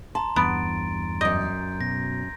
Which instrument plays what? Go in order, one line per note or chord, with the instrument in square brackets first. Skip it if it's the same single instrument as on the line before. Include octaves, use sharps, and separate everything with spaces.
[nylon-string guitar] A5 [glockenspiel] A#5 C6
[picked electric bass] E2 G2 [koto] B3 [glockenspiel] A6 D7
[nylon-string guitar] F#2 D5 [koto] D#5 [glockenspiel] G6
[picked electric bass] B2 [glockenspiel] A#6